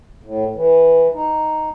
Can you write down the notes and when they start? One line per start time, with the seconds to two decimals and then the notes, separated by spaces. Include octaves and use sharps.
0.24 A2
0.55 E3
1.14 D#4